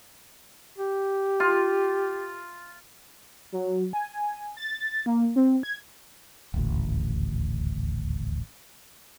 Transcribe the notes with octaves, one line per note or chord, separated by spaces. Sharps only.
G4
F4
F#3
G#5
A6
A#3
C4
G#6
D#1 A1 D2